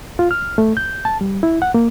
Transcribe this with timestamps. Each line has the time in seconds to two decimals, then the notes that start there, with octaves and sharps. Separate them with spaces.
0.19 F4
0.31 F6
0.58 A3
0.77 G6
1.05 A5
1.21 G3
1.43 E4
1.62 F#5
1.74 A#3